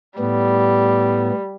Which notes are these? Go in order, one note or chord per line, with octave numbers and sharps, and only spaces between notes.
A2 G3 B3